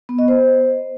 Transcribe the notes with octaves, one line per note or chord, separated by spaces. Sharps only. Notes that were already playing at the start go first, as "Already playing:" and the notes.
B3
D#5
C5